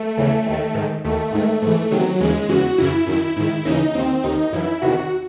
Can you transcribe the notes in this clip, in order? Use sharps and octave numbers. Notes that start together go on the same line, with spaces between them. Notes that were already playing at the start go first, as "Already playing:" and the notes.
Already playing: A3
E2 C#3 E3
D#2 D#3
G#2 D#3
D#2 D#3 A3
G#2 D#3
G#2 E3 A3
E2 C3 D#3 F#3
D#2 C#3 E3 G#3
E2 C#3 E3 F#4
F#2 C#3 E3 E4
F#2 D#3
G#2 D#3
D#2 C#3 E3 D#4
D#2 D#3 C4
D#2 D#3 D#4
F#2 E3 E4
E2 C3 D#3 F#4